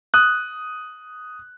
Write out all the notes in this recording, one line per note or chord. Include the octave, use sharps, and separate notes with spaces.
D#6 F#6